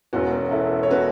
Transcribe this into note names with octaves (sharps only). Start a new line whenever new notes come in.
E1 E2 B2 C#4 F#4
E4 A4
C#5
B2 F#4 B4